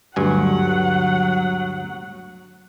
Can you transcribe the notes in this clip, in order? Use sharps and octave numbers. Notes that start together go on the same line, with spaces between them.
D2 G2 F#3 F#5 G#5